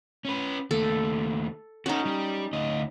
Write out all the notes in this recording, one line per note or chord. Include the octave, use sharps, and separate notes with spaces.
C#4 B4
D#2 A3 A4
C#4 D#4 F#4 A4
G3 G4
D2 D#5